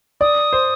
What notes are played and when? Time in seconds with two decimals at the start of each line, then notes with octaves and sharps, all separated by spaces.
0.21 D5 D#6
0.53 C5